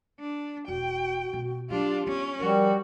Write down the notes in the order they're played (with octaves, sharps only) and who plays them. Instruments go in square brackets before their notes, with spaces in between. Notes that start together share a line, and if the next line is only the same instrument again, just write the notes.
[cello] D4
[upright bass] E1 [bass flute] F#4 [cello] G5
[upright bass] B2
[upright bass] F#3 [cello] D4 F4 [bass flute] G4
[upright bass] B3 [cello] C#4
[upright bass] F3 [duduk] G3 [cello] F#4 [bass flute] A#4